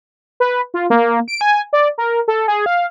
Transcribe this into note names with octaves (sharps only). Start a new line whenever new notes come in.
B4
F4
A#3
D7
G#5
D5
A#4
A4
G#4
F5